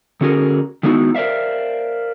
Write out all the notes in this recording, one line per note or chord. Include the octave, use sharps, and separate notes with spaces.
D3 C#4 F#4 G#4 A#4
D#3 G#3 B3 D#4 E4 F#4
A#4 C5 D5 E5 F5